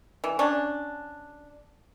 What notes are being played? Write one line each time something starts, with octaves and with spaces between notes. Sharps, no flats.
E3
C#4 D4